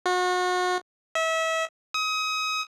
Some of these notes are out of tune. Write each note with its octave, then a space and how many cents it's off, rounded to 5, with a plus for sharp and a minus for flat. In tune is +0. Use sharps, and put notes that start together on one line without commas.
F#4 -35
E5 -30
D#6 +30